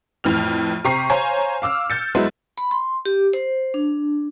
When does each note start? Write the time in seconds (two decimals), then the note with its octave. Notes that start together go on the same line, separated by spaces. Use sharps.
0.24 F2 A2 E3 F6 F7
0.84 C3 G4 A#5 C#6 C7
1.10 C5 C#5 F5 G#5 A#5
1.62 F5 D6 E6 F6
1.90 E6 G6 A6 C#7
2.15 F#2 F#3 G#3 B3 E4
2.58 B5
2.71 C6
3.05 G4
3.33 C5
3.74 D4